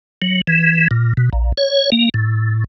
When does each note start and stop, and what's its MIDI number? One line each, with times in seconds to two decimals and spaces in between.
0.22 0.41 54
0.47 0.88 52
0.91 1.13 46
1.17 1.29 47
1.33 1.52 34
1.57 1.90 73
1.92 2.09 58
2.14 2.64 45